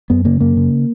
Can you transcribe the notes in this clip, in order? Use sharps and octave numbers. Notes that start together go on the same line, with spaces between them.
F#2 B3
C#3 A#3
F#2 A#3
C#3